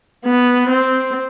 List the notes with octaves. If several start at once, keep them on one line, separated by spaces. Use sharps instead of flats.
B3
C4